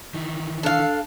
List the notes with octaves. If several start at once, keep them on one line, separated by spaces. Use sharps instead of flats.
D#3 E3
D4 A4 F5